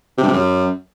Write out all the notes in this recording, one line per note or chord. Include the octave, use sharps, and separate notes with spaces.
C3
G2
C3
F#2